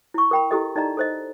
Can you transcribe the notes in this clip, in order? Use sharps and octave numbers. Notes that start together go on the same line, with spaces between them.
E4 C#6
A#4 G5 B5
E4 G4 A4 D#5
D#4 D5 D#5 A#5
A4 C5 D#5